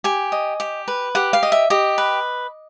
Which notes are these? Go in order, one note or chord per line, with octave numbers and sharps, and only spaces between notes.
G4 G#5
D#5
G4
B4
G4 F#5
F5
D#5
E5
G4 D#5
B4